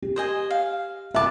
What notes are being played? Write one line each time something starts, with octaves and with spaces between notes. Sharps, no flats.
G4
C5 D#5 G#5
F5
B4 E5 A5 D6